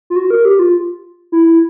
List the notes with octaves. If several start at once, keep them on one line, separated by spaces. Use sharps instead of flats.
F4
F#4
A#4
G4
F4
E4